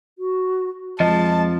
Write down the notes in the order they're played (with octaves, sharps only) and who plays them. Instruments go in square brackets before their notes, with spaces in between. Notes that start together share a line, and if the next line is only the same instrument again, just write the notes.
[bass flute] F#4
[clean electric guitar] F2 F3 [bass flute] G#3 [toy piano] D#5 [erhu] A5